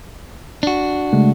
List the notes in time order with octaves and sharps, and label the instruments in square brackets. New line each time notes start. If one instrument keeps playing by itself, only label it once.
[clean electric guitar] D4 F#4
[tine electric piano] C#3 G#3 A3